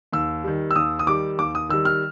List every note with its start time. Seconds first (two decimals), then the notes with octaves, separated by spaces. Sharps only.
0.12 D#2 E6
0.44 D#3 G3
0.71 E6
0.76 D#2 D#6
0.99 D#6
1.07 D#3 G3 D6
1.38 D#2 D6
1.55 D#6
1.69 D#3 G3 E6
1.85 F6